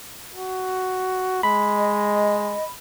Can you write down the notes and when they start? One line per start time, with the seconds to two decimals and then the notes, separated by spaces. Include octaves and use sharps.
0.35 F#4
1.43 G#3 B5
1.78 D#5